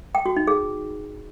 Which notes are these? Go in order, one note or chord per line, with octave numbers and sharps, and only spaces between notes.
G5
F#4
D#4
G#4